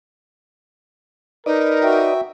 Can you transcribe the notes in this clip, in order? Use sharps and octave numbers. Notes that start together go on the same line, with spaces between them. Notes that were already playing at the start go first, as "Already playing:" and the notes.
D#4 A#4 B4 D5 D#5
F#4 E5 G5